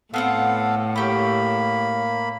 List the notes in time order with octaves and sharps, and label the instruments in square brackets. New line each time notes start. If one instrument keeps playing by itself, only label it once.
[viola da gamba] A2 [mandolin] B3 C4 F#5 [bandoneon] A4 F5
[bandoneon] A#3 B5 [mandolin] C#4 G4